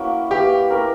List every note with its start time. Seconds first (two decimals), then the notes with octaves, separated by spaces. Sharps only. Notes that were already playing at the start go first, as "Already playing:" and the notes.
Already playing: A#3 C#4 E4 F#4
0.31 A#3 E4 G4 B4 E5
0.70 C#4 G4 A#4 B4